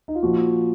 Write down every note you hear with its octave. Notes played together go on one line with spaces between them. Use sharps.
D#4
F4
A#2 F3 F#4